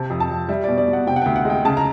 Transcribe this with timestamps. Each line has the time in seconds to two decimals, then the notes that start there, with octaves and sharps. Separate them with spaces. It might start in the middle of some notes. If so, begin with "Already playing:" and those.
Already playing: C3 A5
0.10 F2
0.20 A5
0.30 F2
0.49 G3 E5
0.64 B2 D5
0.78 D5
0.88 B2
0.93 F#5
1.07 C3 G5
1.16 F#5
1.22 D2 G5
1.36 F#5
1.45 G#3 G5
1.65 C#3 A5
1.77 A#5